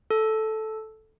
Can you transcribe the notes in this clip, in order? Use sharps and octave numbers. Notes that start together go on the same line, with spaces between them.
A4